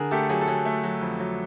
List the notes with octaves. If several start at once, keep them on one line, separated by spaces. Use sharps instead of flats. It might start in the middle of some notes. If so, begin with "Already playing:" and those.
Already playing: D3 G#4 A#4
A3 G4 A4
F#3 G#4
A4
F#3 G#4
A3
F#3
F2
F#3